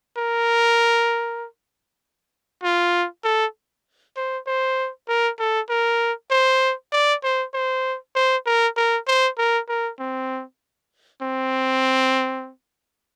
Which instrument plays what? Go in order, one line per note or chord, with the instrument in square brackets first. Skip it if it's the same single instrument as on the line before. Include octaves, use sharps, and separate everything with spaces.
[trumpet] A#4
F4
A4
C5
C5
A#4
A4
A#4
C5
D5
C5
C5
C5
A#4
A#4
C5
A#4
A#4
C4
C4